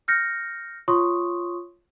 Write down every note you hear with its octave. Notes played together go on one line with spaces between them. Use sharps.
F6 G6 A#6 C#7
F4 C#5 C6 C#6 D#6